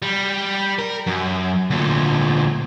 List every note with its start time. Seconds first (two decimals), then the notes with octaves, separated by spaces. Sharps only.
0.02 G3
0.79 A#4
1.07 F#2
1.70 D2 A#2